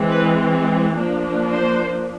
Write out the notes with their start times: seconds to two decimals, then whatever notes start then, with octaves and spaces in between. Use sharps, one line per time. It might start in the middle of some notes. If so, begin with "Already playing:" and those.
Already playing: E3 G#3 C4
0.11 B4
0.96 F3 A#3 D4
1.52 C5